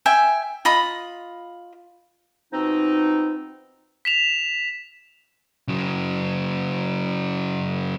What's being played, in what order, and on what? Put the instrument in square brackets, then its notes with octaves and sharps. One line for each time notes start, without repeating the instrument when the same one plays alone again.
[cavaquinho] E5 G5 G#5
F4 D#5 B5 D#6
[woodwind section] B2 F3 C4 D#4
[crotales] B6 E7 F7
[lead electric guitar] C#3 F#3